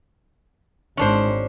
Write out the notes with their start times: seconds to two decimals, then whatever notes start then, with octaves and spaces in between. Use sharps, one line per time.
0.97 G#1 G#2 C#4 D4 C5